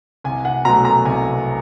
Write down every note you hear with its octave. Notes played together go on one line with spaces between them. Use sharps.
C2 G#5
F#5
B2 F#3 A3 A#5
A#5
C2 G#5